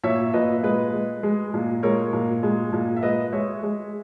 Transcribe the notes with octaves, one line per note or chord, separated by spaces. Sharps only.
A#2 C#5 E5
A#2 B4 D#5
G#3 B4 D#5
G#3
G#3
A#2
G#3 A#4 C#5
A#2
G#3
A#2
E5
G#3 B4 D#5
G#3 C#5 E5
G#3